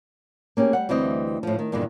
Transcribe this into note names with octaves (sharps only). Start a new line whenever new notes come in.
A#3 C#4 G4 G#4
G3 F#5
D2 E3 G3 C4 D#5
A2 F3
D#3
E2 G2 A#2 D3 D#3